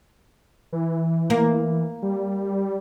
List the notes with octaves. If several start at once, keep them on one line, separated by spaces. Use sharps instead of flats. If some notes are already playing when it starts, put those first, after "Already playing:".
E3
A#3
G3